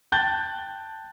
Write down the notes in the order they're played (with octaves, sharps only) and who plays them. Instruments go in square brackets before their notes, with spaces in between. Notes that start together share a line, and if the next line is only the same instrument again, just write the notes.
[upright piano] G5 A5 F#6 G6 A6 G7